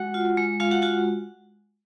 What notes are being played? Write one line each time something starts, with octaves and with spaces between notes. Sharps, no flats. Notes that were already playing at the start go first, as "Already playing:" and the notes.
Already playing: G#3 F#4 F#5
F4
G#3
G#3 F4 F5
F#4 F#5
F4 F#4 F#5